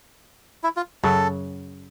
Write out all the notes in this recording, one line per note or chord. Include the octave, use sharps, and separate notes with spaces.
E4
F4
F#2 C#3 F#3 A4